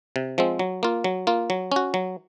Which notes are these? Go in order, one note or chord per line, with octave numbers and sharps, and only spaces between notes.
C3
F3 G#3 C4
F#3
A#3 F4
F#3
A#3 F4
F#3
C#4 F#4
F#3